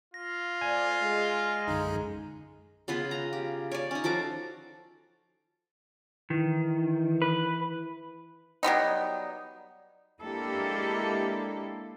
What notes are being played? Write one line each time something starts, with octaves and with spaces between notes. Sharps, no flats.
F4 A#6
A3 C5 D5 G#5
G#3
B1 F#2 D3 D#4
C#3 B3 F4 B4
A#5
G4
C#5 D5
C#4 D#4
F3 F#4 A4 D6
D#3 E3
B4
F#3 G3 B3 D#4
G#3 A#3 D4 E4 G4 A4